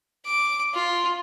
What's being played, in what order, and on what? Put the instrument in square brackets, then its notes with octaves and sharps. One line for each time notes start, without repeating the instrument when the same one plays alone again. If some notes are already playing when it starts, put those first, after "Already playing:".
[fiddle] D6
F4